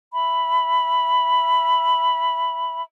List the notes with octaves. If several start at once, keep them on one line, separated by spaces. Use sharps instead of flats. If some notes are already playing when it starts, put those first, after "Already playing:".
E5 B5